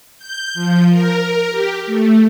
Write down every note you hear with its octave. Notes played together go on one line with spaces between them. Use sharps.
G6
F3
A#4
G4
A3